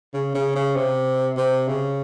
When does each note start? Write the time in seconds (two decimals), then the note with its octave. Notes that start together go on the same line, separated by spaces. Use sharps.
0.14 C#3
0.34 C#3
0.56 C#3
0.76 C3
1.37 C3
1.68 C#3